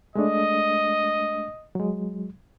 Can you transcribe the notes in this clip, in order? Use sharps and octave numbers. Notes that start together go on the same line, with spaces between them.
G#3 A3 D4 D#5
F#3 G#3